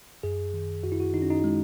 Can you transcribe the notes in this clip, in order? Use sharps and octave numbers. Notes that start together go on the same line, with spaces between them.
F#2 G#4
D#3
F#2 F#4
E4
F#4
D#3 D#4
C#4
D#4
G#3